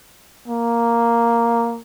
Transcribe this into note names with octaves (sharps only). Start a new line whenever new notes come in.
A#3